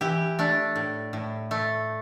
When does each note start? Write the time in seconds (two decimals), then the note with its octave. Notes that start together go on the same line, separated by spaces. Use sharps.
0.01 E3 G4
0.39 A3 D4
0.76 A2
1.13 A2
1.51 A3